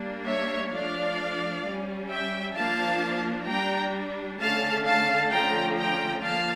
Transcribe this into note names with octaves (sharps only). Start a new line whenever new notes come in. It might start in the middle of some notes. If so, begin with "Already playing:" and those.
Already playing: G3 A#3 D4
C#5 E5
F3 A3 D4 D5 F5
G3 C#4
E5 G5
F3 A#3 D4 F5 A5
G3 D4 G5 A#5
D3 A3 C#4 F5 A5
F5 A5
D3 F3 A3 C#4 G5 A#5
G5 A#5
F3 A#3 F5 A5